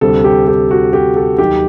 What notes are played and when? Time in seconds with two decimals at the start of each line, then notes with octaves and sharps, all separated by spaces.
0.01 D2 C3 G3 A4
0.24 G4
0.48 G4
0.71 F#4
0.93 G4
1.16 A4
1.38 D#2 D#3 F#3 G4